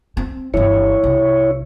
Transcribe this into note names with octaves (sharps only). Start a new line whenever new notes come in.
C4
G1 E3 E4 C#5
C2